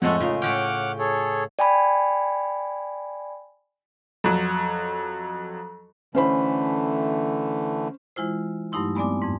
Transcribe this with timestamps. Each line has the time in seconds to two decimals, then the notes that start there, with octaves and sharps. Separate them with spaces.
0.02 F2 A2 G#3 A3 A4 F#5
0.20 C#3 D#4 F4
0.42 A2 C#4 F#5 G5 D6 F6
0.99 G#4 A4 C#5
1.59 D5 G5 G#5 B5
4.24 F2 F#3
6.15 D3 E3 A3 C#4 C5 B5
8.16 E3 G#3 E4 F4 C5
8.72 G2 F#3 A3 D#4 E4 C6
8.96 G#3 B3 C4 D5 G#5 D6
9.22 F2 G#2